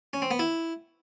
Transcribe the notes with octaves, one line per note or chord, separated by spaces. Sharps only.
C#4
C4
B3
E4